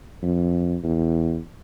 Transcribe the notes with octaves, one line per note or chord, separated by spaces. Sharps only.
F2
E2